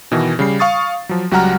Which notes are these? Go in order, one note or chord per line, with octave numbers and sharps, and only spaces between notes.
B2 D#3 E3
C#3 G3 C7
F5 C#6 D#6 A6
F3 F#3
C#2 F#3 G3 F#5 A#5 F6